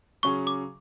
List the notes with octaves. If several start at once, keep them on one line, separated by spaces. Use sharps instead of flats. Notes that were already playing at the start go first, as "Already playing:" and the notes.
C#3 F#3 C#4 G#4 C#6
D6